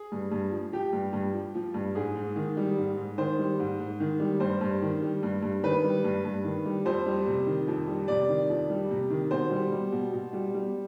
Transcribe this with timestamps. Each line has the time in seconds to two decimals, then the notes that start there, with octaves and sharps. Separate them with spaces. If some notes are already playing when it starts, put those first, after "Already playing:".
Already playing: G#4
0.12 G2
0.32 G2
0.52 F3
0.72 F3 G4
0.93 G2
1.13 G2
1.33 F3
1.55 F3
1.74 G2
1.95 G#2 G#4
2.16 G#2
2.36 D#3
2.57 G3
2.77 G#2
2.97 G#2
3.18 D#3 C5
3.39 G3
3.59 G#2
3.80 G#2
4.00 D#3
4.20 G3
4.40 G2 C5
4.61 G2
4.82 D#3
5.01 G3
5.23 G2
5.43 G2
5.63 D#3 B4
5.84 G3
6.04 G2
6.25 G2
6.44 D#3
6.66 G3
6.85 F2 C5
7.06 G3
7.27 C3
7.47 D#3
7.68 F2
7.88 G3
8.08 C3 D5
8.29 D#3
8.49 F2
8.70 G3
8.91 C3
9.10 D#3
9.31 B2 C5
9.51 G3
9.72 G3
9.92 B2
10.13 B2
10.33 G3
10.54 G3